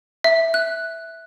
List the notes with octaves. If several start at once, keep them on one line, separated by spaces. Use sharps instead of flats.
E5
F#6